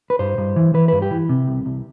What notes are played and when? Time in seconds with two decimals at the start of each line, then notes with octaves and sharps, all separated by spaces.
0.10 B4
0.19 G2 C5
0.38 G2
0.56 E3
0.74 E3 B4
0.88 G2 B4
1.02 G4
1.11 E3
1.29 C3
1.47 C2
1.66 C2